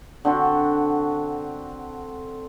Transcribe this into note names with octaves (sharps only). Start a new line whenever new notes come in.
D3 C4 F#4